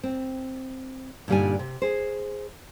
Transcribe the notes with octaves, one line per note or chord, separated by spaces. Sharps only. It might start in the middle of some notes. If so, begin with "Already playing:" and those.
C4
G2 A#2 D3 G3 D#4 G#5
C3
G#4 C5